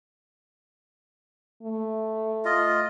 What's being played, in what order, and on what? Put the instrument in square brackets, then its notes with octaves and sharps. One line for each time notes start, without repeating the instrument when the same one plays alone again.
[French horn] A3
[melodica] F4 D#5